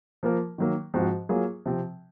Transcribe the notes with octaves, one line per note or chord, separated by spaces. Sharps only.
F3 A#3 F4 A#4
D#3 F#3 A#3
G#2 F3 C4 F#4
F#3 A#3 F4 G#4
C3 F3 C4